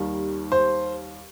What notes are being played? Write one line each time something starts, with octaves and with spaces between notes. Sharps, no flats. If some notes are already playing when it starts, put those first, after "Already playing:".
Already playing: D#2 D#3 G3
C5